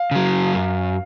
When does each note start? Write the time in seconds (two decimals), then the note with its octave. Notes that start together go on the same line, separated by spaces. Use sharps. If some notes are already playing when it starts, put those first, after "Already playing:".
Already playing: F5
0.11 C#3 F#3
0.53 F#2